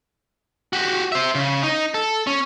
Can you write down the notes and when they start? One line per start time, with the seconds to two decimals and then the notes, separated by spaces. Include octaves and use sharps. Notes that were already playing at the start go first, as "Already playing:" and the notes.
0.73 F#4 G4
1.12 C5 E5
1.35 C#3
1.63 D#4
1.94 A4
2.27 C#4